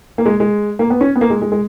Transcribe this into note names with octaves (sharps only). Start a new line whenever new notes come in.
A#3
G#3
G#3
A#3
B3
C#4
B3
A#3
G#3
G#3
G#3